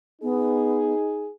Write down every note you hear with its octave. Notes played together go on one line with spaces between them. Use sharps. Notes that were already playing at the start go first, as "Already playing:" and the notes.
B3 D#4 G#4